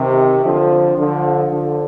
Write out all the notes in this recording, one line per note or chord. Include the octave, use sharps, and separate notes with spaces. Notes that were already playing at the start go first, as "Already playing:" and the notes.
Already playing: C3 D#3
D3 F3
D3 F3
D3 F3